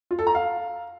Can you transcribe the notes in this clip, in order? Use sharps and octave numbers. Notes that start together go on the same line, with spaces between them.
F4
A4
A#5
F5